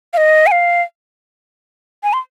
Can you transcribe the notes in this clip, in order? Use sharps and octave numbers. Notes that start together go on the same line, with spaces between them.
F5
D#5
G#5
F5
G#5
C6